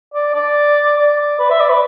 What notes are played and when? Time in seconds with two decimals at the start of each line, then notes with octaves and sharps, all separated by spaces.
0.14 D5
0.34 D5
0.97 D5
1.39 B4
1.50 E5
1.60 D5
1.70 B4